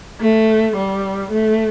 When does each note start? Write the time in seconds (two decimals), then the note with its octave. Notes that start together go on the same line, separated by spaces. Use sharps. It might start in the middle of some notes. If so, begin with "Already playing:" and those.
0.21 A3
0.76 G3
1.31 A3